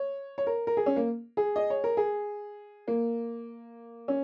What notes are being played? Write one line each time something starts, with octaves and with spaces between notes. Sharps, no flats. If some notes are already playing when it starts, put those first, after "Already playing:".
Already playing: C#5
C#5
A#4
A#4
G#4
C#4
A#3
G#4
D#5
C#5
A#4
G#4
A#3
C#4